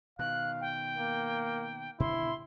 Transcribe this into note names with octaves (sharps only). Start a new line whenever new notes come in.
B2 D#3 F5 F#6
G5
A#3
B2 D3 D#3 E4 C6